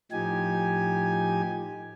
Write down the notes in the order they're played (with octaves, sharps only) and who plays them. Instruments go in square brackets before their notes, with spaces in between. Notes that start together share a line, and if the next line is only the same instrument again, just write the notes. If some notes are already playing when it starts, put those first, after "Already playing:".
[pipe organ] A2 F3 D#4 G4 G#5